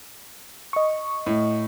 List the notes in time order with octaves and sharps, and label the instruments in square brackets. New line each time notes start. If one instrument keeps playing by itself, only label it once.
[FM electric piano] D#5 C#6
[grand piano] A2